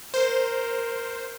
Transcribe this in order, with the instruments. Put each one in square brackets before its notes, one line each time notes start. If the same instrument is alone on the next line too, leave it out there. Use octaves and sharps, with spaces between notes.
[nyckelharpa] A#4 [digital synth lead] C5